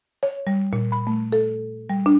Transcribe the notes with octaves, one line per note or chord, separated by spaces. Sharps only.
C#5
G3
A#2
B5
A3
A4
G3
D4